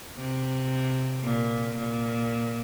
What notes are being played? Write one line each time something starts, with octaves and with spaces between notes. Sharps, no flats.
C3
A#2
A#2